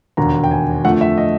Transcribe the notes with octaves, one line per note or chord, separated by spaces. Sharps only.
E1 D#2 D3 A#5
G5
G#5
F2 D3 F3 A3 F#5
E5
D#5